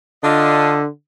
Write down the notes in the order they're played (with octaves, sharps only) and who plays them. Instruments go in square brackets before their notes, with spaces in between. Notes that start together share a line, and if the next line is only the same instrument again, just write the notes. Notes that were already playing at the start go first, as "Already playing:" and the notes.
[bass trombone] D3 [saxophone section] D4 F4 D#5